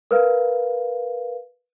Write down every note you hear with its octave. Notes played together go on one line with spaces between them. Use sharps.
A#4 B4 F5